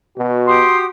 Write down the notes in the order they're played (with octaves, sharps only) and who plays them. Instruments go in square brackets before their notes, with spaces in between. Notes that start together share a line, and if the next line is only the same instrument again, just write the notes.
[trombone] B2 [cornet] F#4
[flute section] G4 D#6 [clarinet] C6